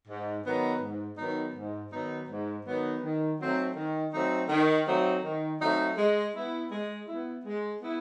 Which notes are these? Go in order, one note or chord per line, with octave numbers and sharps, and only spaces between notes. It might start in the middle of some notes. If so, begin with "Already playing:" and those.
G#2
D#3 F#3 B3 D#4
G#2
D#3 F#3 B3 D#4
G#2
D#3 F#3 B3 D#4
G#2
D#3 F#3 B3 D#4
D#3
F#3 A3 C4 D#4
D#3
F#3 A3 C4 D#4
D#3
F#3 A3 C4 D#4
D#3
F#3 A3 C4 D#4
G#3
B3 E4
G#3
B3 E4
G#3
B3 E4